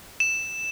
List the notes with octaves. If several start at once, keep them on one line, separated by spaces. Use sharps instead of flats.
E7